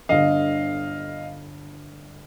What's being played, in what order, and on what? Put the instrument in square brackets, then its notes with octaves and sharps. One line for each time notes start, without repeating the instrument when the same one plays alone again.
[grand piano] G1 G2 D3 [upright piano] D#5 F5